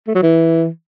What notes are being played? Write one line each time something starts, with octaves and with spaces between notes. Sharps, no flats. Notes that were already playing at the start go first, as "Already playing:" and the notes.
A3
F#3
E3